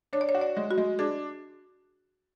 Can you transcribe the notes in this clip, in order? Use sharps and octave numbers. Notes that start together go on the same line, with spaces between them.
D4 C#5
D5
C#5
F#4
D5
G#3
F#4
G#3
D4 G#4